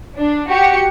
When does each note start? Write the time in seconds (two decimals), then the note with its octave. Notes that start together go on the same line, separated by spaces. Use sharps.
0.16 D4
0.50 F#4 G4 C#7